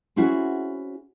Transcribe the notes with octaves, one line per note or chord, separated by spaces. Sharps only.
C4 C#4 E4 F#4 G#4